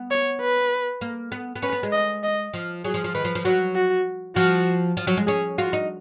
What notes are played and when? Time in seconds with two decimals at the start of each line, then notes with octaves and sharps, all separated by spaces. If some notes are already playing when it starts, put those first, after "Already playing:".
Already playing: B3
0.11 C#5
0.41 B4
1.01 A#3
1.32 B3
1.56 B3
1.62 C#4 B4
1.72 B3
1.83 G#3
1.92 D#5
2.23 D#5
2.53 F3
2.84 F#3 G#4
2.94 F3
3.04 F3
3.14 D#3 B4
3.25 F3
3.35 F3
3.45 F#3 F#4
3.75 F#4
4.36 F3 F#4
4.97 F3
5.07 F#3
5.17 G#3
5.27 C#4 G#4
5.58 F4 F#4
5.73 D#4